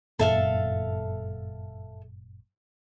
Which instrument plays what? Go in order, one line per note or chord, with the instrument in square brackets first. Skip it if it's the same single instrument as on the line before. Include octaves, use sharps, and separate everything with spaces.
[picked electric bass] G1 F#2 A#2 [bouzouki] A4 E5 F5